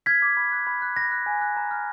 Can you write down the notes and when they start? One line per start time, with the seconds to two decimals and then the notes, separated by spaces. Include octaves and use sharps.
0.06 F6 G#6 B6
0.22 D6
0.37 B5
0.52 F#6
0.67 B5
0.82 F#6
0.97 B5 A#6
1.12 F#6
1.26 G#5
1.42 F#6
1.57 A#5
1.71 F6